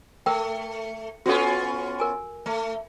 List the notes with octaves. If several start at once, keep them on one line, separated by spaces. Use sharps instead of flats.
A3 A#4 G5
B3 C#4 F4 F#4 A4
A#4 G#5
A3